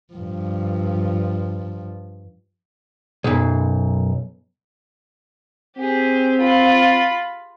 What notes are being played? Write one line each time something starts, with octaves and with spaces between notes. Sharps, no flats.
G2 F3
B1 F#2
C4 G4 G#4
F4 B5